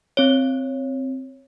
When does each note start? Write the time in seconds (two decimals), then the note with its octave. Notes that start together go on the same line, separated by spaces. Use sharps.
0.17 C4 C#5